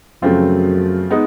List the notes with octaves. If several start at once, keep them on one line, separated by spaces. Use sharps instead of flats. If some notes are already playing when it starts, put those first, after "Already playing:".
F#2 C#3 F3 A3 C4 F4
G#3 B3 D#4